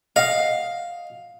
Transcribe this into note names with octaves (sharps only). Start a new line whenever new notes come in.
D#5 F5 F#5